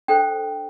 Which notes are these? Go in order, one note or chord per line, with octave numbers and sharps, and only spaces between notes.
D4 A4 C5 G5